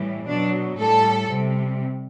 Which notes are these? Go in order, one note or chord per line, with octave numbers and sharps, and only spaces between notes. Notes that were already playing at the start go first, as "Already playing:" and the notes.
Already playing: A2 E3 G3
B2 F#3 D4
A2 G3 A4
C3 G3